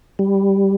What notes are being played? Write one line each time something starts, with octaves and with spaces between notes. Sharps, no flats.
G3